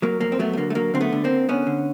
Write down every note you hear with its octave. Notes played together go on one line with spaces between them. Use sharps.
F#3 A#3
F2 A#3
C4
F#3 A3 B3
A3
D3 A#3
A3
F#3 A#3
D3 C4
A3 B3
D3
A#3 C4
D3
D3 B3 C#4
D3